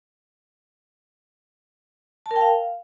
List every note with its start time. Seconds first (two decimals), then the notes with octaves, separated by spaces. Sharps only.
2.26 A5
2.31 A#4
2.36 G5
2.41 F5